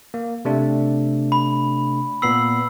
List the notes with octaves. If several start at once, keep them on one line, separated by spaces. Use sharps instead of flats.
A#3
C3 A3 D4
B5
A#2 B3 B5 E6 C7 F#7